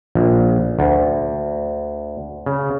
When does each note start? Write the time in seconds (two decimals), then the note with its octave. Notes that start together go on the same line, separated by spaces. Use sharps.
0.15 A#1
0.79 D2
2.46 C#3